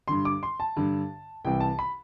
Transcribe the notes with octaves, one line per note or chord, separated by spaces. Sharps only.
G2 D3 C6
D6
C6
A5
G2 D3
C2 C3 E3 G5
A5
B5